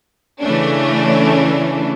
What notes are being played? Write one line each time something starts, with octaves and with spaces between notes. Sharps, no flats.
C#3 E3 A3 C#4 D4